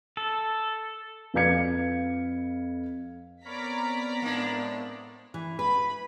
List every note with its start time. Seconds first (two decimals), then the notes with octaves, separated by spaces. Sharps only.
0.17 A4
1.34 F2 B4 F5 G#6 C#7
3.45 B3 C4 A#4 C#5 D5 A#5 B5 B6
4.22 A2 G#3 A#3 D4
5.34 E3
5.59 B4 B5